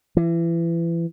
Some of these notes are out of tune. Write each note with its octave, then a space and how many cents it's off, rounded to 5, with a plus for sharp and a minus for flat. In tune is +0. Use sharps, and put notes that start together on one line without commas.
E3 +30